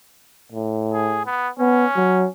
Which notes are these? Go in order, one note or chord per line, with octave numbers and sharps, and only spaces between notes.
A2
G#4
B3
B3 C#4
F#3